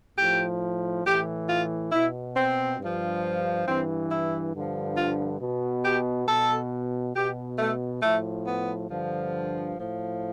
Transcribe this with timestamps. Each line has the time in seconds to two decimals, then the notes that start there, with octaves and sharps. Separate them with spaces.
0.18 A2 F3 G4
1.05 A2 E3 G4
1.49 F4
1.92 B2 E4
2.35 C4
2.79 G2 F3
3.66 G2 E3 C4
4.10 E4
4.54 G2 D3 F3
4.97 F4
5.40 B2
5.84 G4
6.28 B2 A4
7.15 B2 G4
7.58 A3
8.02 A2 F3 A3
8.46 B3
8.90 G2 D3 F3
9.77 A2 F3